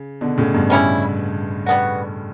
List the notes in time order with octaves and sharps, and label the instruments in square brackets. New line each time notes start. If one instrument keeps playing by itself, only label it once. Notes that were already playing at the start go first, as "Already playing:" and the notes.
Already playing: [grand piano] C#3
B2 D3
A2 C#3
G2 B2
[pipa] G3 C#4 E4
G3 B3 F#4